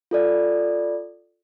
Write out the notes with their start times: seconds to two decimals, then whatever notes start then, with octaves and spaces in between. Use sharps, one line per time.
0.11 F4 A4 D5